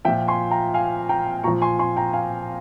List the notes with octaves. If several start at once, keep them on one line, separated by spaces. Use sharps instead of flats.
A#2 F3 E5 G5
G#5 C6
G5 A#5
F5 G#5
G5 A#5
A#2 F3 A#5 C#6
G#5 C6
G#5 C6
G5 A#5
F5 G#5